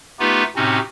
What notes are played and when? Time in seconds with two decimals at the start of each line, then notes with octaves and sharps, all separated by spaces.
0.19 A3 B3 D#4 F4 G4 B4
0.56 A2 C3 C4 C#4 D#4 F#4